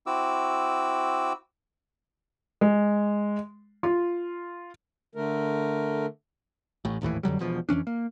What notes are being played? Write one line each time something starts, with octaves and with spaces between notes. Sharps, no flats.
C4 E4 F#4 D6 E6
G#3
F4
D3 A3 A#4
A1 A2
G#1 D#2 A2 E3
F2 D3 F#3 G3
E1 E2 B2 F3
F2 E3 C#4 D4
A#3